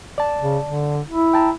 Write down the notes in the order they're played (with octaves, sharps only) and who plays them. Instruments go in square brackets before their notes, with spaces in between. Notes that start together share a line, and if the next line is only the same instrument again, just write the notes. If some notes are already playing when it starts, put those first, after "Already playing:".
[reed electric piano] D5 A5
[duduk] C#3
D3
E4
[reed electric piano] G5 A5 A#5